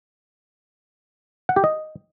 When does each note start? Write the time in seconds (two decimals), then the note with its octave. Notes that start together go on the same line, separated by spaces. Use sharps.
1.49 F#5
1.56 G4
1.64 D#5